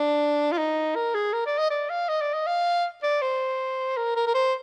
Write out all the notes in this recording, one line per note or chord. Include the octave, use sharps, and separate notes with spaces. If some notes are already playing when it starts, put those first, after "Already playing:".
Already playing: D4
F4
D#4
A#4
G#4
A#4
D5
D#5
D5
F5
D#5
D5
D#5
F5
D5
C5
A#4
A#4
A#4
C5